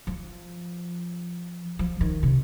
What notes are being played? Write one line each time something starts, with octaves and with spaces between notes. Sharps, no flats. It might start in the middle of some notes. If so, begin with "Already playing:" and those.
F3
F3
D#3
C3